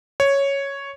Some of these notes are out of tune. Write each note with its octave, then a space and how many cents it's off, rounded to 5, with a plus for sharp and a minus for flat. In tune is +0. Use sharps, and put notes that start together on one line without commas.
C#5 +0